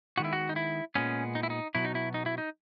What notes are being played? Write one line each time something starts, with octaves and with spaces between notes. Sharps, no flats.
D#3 G#3 B3 F#4
E4
F#4
D#4
E4
A#2 G#3 B3 C#4
D#4
E4
D#4
B2 F#3 B3 E4
D#4
E4
D#4
E4
D#4